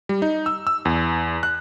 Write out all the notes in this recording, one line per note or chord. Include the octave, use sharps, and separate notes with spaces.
G3
D#4
E6
E6
E2
F#6